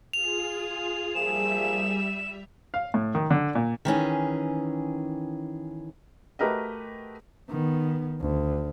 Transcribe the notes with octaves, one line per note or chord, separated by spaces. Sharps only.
F4 G#4 F7
F3 G3 A#3 G#4 E5 E7
F5
A2
D#3
D3
A#2
D#3 E3 C#4 G#4
A3 F#4 G4 A#4 B4 D#5
D#3 B3
D2